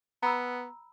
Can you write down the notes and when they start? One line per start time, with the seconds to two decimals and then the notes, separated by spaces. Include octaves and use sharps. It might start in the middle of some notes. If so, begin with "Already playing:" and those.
0.23 B3 A#5 B5 E6